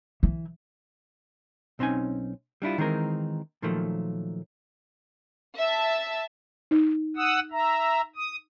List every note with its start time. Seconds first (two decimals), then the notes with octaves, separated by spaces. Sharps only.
0.23 E3
1.79 B1 C4 C#4 D#4 G#5
2.62 G3 D4 E4 F4
2.78 D#3 E3 G#3 C4 D#4 A#4
3.62 A#2 D#3 F3 F#3 A3
5.59 E5 A5
6.71 D#4
7.17 F#5 D#6 E6
7.52 E5 A#5
8.16 D#6